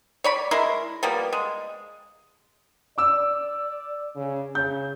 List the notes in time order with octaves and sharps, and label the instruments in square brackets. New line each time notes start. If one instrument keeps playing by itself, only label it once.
[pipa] C#5 D5 B5
G#3 E4 A#4
F3 G3 A#3 B3
G#3
[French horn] D5 [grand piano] D6 E6
[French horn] C#3
[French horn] C#3 [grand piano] G6